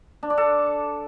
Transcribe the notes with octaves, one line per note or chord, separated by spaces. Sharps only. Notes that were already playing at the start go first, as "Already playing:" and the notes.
D4
D5
A4